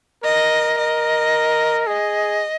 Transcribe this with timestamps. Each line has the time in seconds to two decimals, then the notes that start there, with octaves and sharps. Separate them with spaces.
0.23 A#4 D#5
0.78 D#5
1.87 G#4 D#5